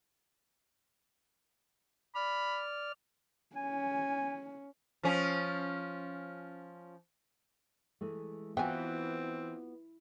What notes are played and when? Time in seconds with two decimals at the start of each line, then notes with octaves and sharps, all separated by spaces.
2.15 D5 B5 F6
3.56 C#4 G#5
5.03 F3 C#4
8.01 E3 G#3 A3
8.57 E3 B3 C4 F4 F#4 G5 G#5